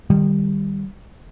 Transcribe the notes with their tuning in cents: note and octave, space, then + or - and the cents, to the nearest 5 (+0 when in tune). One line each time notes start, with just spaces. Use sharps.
D#3 -25 G3 +5